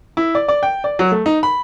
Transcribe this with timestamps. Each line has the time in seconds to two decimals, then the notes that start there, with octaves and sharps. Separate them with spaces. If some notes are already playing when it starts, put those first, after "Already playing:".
0.17 E4
0.35 D5
0.48 D5
0.63 G5
0.84 D5
0.99 F#3
1.12 A3
1.26 D#4
1.43 B5